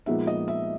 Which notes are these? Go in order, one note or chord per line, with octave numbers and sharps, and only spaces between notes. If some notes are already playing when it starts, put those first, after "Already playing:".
A#2 F3 G#3 B3 D#4 E5
D#5
E5